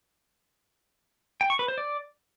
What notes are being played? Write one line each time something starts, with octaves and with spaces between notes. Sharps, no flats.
G5
C#6
B4
C5
D5